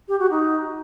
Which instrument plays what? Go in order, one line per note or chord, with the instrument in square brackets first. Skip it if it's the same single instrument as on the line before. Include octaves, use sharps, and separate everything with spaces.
[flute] G4
F#4
D#4